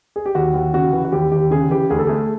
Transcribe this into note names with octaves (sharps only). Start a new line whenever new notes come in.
G#4
G4
D#2 F#4
D#2
C#3 F#4
E3
F#4
D#2 G4
D#2 G4
C#3 G#4
E3 G4
D2 G#4
A4
A3 G#4